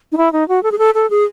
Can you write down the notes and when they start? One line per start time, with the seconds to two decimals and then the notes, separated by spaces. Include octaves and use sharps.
0.12 D#4
0.17 E4
0.33 D#4
0.48 F#4
0.63 A4
0.72 G#4
0.79 A4
0.95 A4
1.10 G#4